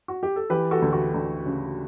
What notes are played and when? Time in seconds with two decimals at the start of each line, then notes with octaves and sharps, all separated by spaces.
0.08 F#4
0.23 G4
0.36 A4
0.50 E3 G4 B4
0.71 F#4 A4
0.82 D2
0.92 F#4 A4
1.14 D2
1.46 C#3